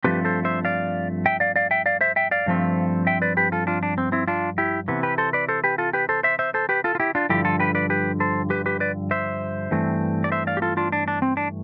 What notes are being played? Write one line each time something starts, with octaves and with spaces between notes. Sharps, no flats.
G2 F3 A3 C4 G4 B4
A4 C5
C5 E5
D5 F5
E5 G5
D5 F5
D5 F5
E5 G5
D5 F5
C5 E5
E5 G5
D5 F5
G2 F3 A3 C4
E5 G5
B4 D5
G4 B4
F4 A4
D4 F4
D4
C4
C4 E4
D4 F4
E4 G4
C3 E3 B3
G4 B4
A4 C5
B4 D5
A4 C5
G4 B4
F4 A4
G4 B4
A4 C5
C5 E5
C5 E5
A4 C5
G4 B4
F4 A4
F4
E4 G4
D4 F4
G2 D3 F3 E4 G4
F4 A4
G4 B4
B4 D5
G4 B4
A4 C5
G4 B4
G4 B4
B4 D5
C5 E5
G2 E3 A3 C4
D5
C5 E5
D5 F5
G4
F4 A4
D4 F4
D4
D4
C4
D4